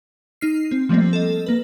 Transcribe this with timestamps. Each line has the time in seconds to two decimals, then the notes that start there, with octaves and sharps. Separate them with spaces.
0.41 D#4 F6 C7
0.71 C4
0.89 F3 G3 A3 A#3 C4
1.13 A4 D#5
1.46 A#3 B4